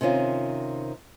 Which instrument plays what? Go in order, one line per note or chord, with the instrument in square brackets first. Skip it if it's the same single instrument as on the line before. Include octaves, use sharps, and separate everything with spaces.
[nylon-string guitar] C3 D#3 C#4 F4